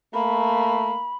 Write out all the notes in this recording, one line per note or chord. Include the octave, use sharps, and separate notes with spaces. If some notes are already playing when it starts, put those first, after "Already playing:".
A3 A#3 B5